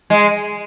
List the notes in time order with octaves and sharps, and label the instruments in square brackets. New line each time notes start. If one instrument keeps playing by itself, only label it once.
[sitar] G#3